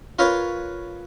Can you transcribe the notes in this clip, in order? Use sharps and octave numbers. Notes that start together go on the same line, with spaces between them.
F4 A#4 B4 C#5 F5